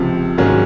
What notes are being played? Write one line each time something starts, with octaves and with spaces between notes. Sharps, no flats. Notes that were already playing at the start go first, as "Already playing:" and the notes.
Already playing: C#2 C3 F3
G#2 D#3 F#3 A#3 C#4